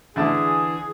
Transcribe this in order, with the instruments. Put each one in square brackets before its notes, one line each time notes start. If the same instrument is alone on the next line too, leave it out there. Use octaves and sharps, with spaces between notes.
[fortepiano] D3 E4 A5 [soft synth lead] E3 [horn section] G#4